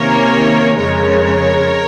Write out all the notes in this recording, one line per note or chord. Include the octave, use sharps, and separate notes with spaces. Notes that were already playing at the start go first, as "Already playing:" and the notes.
Already playing: C3 D#3 A#3 C#4 A#4 C#5
F2 C#3 G#3 A#4 C#5